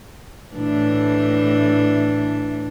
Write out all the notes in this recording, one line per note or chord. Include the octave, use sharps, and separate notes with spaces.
A2 E3 D4